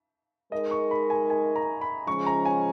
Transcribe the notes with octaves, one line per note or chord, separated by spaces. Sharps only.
G#3 D#4 A#4 D#5
C#6
B5
G#5
G#5
A#5
B5
C#3 F3 G#3 C#4 C#6
A#5
G#5